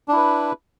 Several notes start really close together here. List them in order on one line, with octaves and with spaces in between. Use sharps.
D4 E4 B4